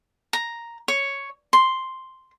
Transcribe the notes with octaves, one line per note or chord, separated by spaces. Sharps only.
A#5
C#5
C6